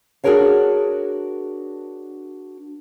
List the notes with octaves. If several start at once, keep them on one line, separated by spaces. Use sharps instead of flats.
D4 F#4 G#4 A#4 C#5 F5